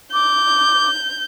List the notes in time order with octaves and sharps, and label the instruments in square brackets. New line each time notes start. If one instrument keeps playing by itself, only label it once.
[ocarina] D6 [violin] G6